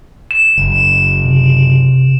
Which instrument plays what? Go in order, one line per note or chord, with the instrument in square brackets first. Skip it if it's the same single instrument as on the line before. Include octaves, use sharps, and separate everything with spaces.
[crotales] E7
[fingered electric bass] F#1
[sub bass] C3